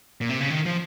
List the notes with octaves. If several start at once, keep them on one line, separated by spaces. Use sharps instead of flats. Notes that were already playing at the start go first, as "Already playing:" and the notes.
A#2
C3
C#3
D#3
F3